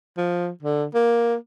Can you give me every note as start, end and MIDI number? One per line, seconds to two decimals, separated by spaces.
0.17 0.49 53
0.62 0.85 50
0.94 1.35 58